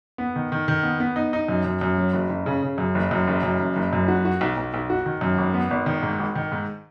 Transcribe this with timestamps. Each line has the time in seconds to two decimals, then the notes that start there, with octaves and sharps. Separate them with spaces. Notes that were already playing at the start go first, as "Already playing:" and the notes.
0.18 B3
0.36 D#3
0.52 D#3
0.68 D#3
0.83 B3
1.00 B3
1.16 D#4
1.33 D#4
1.48 F#2
1.65 F#2
1.81 F#2
1.97 F#3
2.13 F#1
2.29 F#1
2.46 C#3
2.63 C#3
2.78 F#2
2.95 F#1
3.11 F#2
3.27 F#1
3.43 F#2
3.59 F#1
3.76 F#1
3.93 F#2
4.08 F#4
4.25 F#4
4.41 B1
4.57 B1
4.74 B1
4.90 F#4
5.06 D#3
5.21 F#2
5.38 G#1
5.54 B3
5.71 G#1
5.86 D#3
6.03 G#2
6.19 G#1
6.35 D#3
6.52 G#2